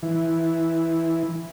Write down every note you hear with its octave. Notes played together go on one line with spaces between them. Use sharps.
E3